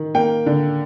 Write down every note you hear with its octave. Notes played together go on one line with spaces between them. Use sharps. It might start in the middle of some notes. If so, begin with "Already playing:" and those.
Already playing: D#3
A#3 G5
D3